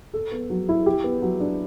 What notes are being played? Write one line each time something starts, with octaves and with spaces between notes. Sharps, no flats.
A4
B3
F#3
E4
G4
B3
F#3
D4